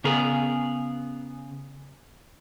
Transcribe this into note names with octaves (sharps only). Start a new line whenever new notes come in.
C#3 B3 G#4 A#4